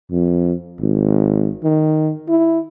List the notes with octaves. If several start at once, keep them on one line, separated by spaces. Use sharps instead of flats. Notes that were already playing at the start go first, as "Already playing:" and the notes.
F2
G#1
D#3
E4